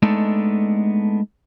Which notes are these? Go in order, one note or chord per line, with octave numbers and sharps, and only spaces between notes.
G#3 A3 B3 D4 D#4 A4